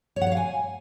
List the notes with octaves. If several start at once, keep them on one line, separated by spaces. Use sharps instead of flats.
C#5
F#5
C#5
F5
G#5